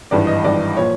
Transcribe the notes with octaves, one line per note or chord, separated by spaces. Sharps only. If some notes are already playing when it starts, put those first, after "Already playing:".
G#1 G2 E3 D5
D#5
G#1 G2 E3 D5
A#2 F3 C#5